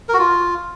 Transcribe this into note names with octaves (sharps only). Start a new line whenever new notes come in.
A#4
F#4
F4